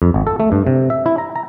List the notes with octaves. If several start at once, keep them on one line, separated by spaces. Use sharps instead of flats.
F2
G#1
A4
A3
G2
C3
E5
E4
A#5
A#5